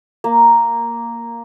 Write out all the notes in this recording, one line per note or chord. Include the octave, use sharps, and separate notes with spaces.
A#3